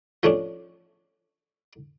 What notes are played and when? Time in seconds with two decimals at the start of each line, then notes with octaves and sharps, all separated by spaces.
0.23 F3 A3 C#4 D4